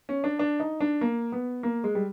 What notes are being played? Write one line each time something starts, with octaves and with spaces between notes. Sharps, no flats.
C#4
D4
D4
D#4
D4
A#3
B3
A#3
G#3
G3